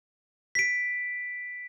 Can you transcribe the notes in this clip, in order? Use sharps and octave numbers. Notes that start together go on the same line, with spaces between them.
B6 D7